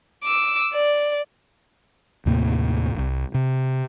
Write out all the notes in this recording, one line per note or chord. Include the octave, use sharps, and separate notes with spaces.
D6 E6
D5
D#2 A2 C3 A#3
D1 C2
C3